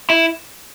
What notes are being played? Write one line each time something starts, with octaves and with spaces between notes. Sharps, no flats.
E4